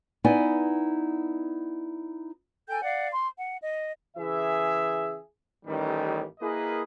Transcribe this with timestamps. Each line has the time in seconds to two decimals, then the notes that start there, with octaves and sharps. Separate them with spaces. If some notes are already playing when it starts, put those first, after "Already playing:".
0.24 B3 D#4 E4 D5 G#5
2.68 A4 G5 G#5 G6
2.82 D5 F5 F#5
3.13 C6
3.38 F#5
3.61 D#5
4.17 C#3 E3 G#4 E5
5.66 A1 D#3 G3
6.40 A#3 E4 G#4 A#4 B4 D#5